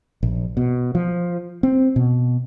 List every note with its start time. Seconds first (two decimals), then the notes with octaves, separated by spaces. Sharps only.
0.23 A#1
0.57 B2
0.95 F3
1.63 C4
1.96 B2